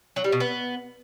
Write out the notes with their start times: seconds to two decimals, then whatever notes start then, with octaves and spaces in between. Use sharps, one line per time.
0.16 F#3
0.24 G3
0.32 B2
0.40 B3